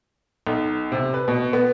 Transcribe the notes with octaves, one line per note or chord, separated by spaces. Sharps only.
B1
C3
B4
B2
B3